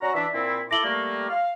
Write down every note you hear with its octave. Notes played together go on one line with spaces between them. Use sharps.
C#4 F#4 D5 A#5
E3 D4 D5 E5 B6
A#2 C4 E4
E4 A4 D6 A#6 F#7 G7
G3 A3 A#3
F5